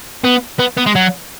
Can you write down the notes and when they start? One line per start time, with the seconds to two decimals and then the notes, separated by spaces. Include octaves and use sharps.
0.24 B3
0.59 B3
0.78 B3
0.87 G#3
0.96 F#3